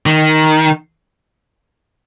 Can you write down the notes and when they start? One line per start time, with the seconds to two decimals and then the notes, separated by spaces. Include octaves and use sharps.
0.06 D#3